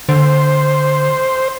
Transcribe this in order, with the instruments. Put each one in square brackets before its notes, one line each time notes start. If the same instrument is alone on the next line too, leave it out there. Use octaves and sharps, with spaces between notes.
[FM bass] D3 [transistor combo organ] C5